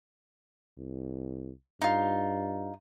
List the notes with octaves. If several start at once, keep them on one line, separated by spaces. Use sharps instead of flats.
C2
G2 D#4 F4